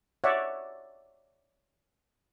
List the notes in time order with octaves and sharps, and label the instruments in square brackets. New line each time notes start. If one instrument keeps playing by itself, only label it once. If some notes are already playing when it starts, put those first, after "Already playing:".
[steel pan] C#5 D5 E5 F#5